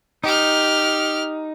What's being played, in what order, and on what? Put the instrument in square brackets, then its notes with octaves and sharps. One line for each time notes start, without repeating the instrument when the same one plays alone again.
[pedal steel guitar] D#4 [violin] G4 F6